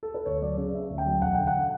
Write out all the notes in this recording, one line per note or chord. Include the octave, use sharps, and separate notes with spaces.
A4
B4
D2 C#5
F#3 D5
C#3
C#4 E5
D2
G5
F#3
E1 F#5
D3 G5
F#5